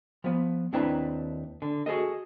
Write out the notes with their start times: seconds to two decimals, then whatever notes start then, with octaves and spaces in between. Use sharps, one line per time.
0.24 F3 B3
0.73 D#2 C4 D4 E4 B4 A#5
1.62 D3
1.86 F#4 G#4 A4 D#5